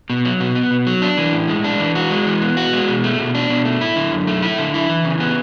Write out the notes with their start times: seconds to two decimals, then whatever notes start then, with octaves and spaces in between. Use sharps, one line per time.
0.10 B2
0.25 F#3
0.40 B2
0.55 B3
0.71 B2
0.87 F#3
1.02 D4
1.18 E3
1.33 A2
1.48 G#3
1.64 D4
1.80 E3
1.95 F#4
2.11 G#3
2.27 E3
2.42 B3
2.57 F#4
2.73 G#3
2.88 B2
3.04 A3
3.19 B2
3.35 D4
3.50 B2
3.65 A3
3.81 E4
3.96 D3
4.11 F#2
4.27 A3
4.42 E4
4.58 D3
4.74 E4
4.89 E3
5.05 C#3
5.20 B3